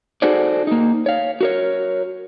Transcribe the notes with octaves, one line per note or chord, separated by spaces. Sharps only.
D#4 F#4 G#4 A4 C5 D5
A#3 D#4
C#5 F5
F#4 A#4 C#5